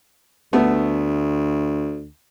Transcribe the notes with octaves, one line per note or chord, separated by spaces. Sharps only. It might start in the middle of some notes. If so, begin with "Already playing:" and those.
D2 A3 B3